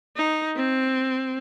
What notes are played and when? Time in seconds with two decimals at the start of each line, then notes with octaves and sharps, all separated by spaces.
0.17 D#4
0.57 C4